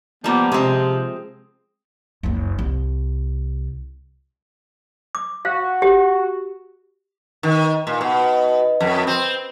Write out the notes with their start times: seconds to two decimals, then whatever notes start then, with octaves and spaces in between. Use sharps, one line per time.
0.24 F3 G3 A#3 B3
0.52 C3 G#3 C4
2.23 F#1 C#2
2.59 C2
5.15 D6
5.45 F#4 F5
5.82 G4
7.43 D#3
7.87 A#2
8.01 B2
8.81 F2
9.07 C4